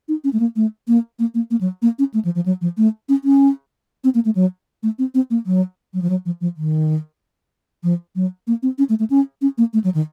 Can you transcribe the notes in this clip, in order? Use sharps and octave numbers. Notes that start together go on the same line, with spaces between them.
D#4
C#4
A3
A#3
A3
A#3
A#3
A#3
A#3
F#3
A#3
C#4
A3
F3
F3
F#3
F3
A3
C#4
C#4
C4
A#3
A3
F#3
A3
C4
C4
A#3
F#3
F#3
F3
F#3
F3
F3
D#3
F3
F#3
A#3
C4
C#4
A3
A3
C#4
C#4
A#3
A3
F#3
D#3